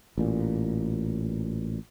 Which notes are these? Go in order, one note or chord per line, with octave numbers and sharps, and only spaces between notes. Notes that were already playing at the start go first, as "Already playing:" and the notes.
A1 A#2